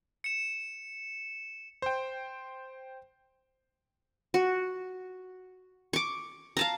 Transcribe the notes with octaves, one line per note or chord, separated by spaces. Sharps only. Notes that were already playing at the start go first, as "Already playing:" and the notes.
C#7 E7
C5 G5
F#4
C#6 D6
F5 A5 A#5